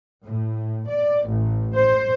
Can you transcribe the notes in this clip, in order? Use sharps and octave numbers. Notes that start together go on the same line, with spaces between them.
A2
D5
A1
C5